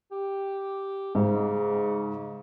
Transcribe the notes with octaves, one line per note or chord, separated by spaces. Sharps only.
G4
G#2 C#3